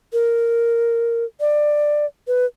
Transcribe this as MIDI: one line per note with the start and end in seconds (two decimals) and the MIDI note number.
0.13 1.25 70
1.40 2.06 74
2.27 2.46 71